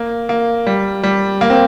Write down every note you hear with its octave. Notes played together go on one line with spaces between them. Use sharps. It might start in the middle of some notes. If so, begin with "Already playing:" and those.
Already playing: A#3
A#3
G3
G3
A#3
C4